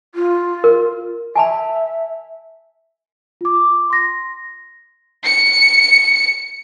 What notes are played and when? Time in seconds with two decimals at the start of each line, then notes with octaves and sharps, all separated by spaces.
0.15 F4
0.64 A#4
1.36 E5 G#5 A5 B5
3.41 F4 D6
3.90 C6 A#6
5.24 C#7